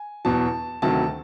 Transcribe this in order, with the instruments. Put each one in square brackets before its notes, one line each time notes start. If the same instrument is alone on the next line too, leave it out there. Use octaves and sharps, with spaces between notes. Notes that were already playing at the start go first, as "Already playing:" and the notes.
Already playing: [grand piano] G#5
E2 B2 F#3 A5
D2 C3 D#3 F#3 A5